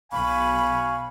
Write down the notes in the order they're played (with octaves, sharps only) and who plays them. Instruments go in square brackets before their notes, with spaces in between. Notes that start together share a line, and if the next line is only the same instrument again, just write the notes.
[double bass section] B1 [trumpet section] F5 G#5 C#6 [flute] B5